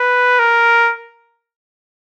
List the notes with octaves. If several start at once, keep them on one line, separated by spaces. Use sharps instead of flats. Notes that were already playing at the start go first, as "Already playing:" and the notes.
Already playing: B4
A#4